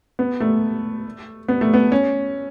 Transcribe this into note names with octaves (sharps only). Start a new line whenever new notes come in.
B3
A3
B3
A3
B3
C#4